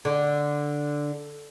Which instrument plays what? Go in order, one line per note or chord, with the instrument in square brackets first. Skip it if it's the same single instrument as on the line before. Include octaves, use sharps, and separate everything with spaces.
[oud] D3